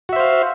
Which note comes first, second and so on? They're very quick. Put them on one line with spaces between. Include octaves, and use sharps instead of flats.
F#4 E5 C5 F5